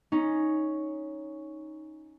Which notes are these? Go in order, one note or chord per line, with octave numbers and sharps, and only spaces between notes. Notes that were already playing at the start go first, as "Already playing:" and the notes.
C#4 D#4